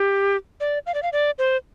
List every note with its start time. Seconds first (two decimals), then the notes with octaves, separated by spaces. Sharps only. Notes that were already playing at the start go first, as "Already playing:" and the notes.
Already playing: G4
0.60 D5
0.86 F5
0.94 D5
1.03 F5
1.13 D5
1.38 C5